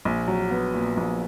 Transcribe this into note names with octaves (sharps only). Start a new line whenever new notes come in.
A#1
F#3
B3
A#2
A#1